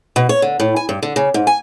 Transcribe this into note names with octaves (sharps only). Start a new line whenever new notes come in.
B2
C#5
D3
A2
G#5
G2
D3
C#3
G#2
G#5